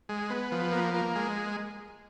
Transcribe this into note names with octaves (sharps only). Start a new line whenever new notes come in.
G#3
B3
F3
A#3
A#3
G#3